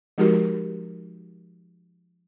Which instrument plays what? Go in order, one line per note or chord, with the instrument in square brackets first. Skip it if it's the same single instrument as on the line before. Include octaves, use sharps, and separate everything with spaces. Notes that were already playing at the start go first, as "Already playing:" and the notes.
[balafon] F3 G#3 D#4 F#4 G4 A#4